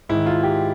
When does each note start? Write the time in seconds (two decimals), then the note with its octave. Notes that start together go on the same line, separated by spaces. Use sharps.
0.09 G#2 D#3 E4
0.26 F4
0.43 G4